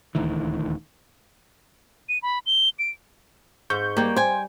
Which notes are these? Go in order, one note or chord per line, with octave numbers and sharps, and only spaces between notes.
D#1 D2 D#3 E3
D#7
B5
G7
D7
G#2 C#6 G6
G3 A#3 G4
C5 G5 G#5